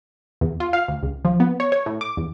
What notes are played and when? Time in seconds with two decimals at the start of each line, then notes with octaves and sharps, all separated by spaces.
0.41 E2
0.60 F4
0.73 F5
0.88 D2
1.03 C#2
1.25 F3
1.40 B3
1.60 C#5
1.72 C#5
1.86 A2
2.01 D6
2.17 E2